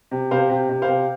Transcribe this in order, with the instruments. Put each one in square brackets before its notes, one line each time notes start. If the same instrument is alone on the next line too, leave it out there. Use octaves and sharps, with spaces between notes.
[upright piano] C3
C3 C5 F5
C3
C3
C5 F5
C3